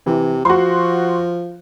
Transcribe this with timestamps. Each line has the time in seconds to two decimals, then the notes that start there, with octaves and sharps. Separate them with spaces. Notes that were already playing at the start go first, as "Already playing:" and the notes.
0.06 C3 E3
0.45 F3 F#4 C6